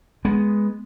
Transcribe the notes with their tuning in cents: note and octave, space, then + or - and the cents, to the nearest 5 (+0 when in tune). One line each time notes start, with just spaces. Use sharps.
G#3 +0 B3 +0